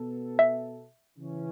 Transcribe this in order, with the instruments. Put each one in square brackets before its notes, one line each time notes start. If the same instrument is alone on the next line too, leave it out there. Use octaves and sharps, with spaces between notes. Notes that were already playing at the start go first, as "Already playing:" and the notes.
Already playing: [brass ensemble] B2 B3 A4
[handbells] E5
[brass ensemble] C#3 E3 C#4